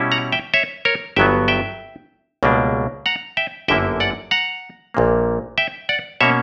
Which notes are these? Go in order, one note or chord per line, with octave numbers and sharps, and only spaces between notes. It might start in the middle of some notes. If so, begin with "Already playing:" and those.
Already playing: B2 G3 C#4 E4
F#5 A#5
E5 G5
C#5 E5
A#4 C#5
G1 G2 F#3 B3 E5 G5
E5 G5
C#2 B2 G3 A#3 D4
F#5 A#5
E5 G5
G1 F#2 D3 A#3 E4 E5 G5
D5 F#5
F#5 A#5
A#1 A#2 A#3
E5 G5
D5 F#5
B2 A#3 C#4 C#5 E5